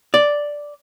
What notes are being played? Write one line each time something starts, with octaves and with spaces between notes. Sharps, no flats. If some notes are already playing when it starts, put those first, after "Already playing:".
D5